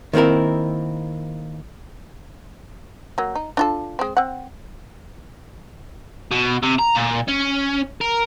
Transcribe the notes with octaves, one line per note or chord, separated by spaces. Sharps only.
D#3 A#3 C4 E4 A#4
F#3 A#3
D#4
D4 F4 A4
G#3 C4
C4 F#5
B2
C3
A#5
A#2
C#4
A#4